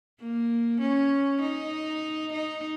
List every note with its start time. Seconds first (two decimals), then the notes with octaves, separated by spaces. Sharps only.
0.20 A#3
0.80 C#4
1.41 D#4
2.33 D#4